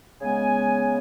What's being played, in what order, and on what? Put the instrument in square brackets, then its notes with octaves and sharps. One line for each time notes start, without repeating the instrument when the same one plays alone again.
[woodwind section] C#3 G#3 B3 G#5